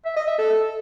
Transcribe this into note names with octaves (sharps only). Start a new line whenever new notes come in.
E5
D#5
E5
A4